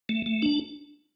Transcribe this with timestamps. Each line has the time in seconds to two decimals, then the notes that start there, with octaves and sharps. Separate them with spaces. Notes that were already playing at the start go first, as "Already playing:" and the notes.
0.09 A3
0.26 A3
0.42 D4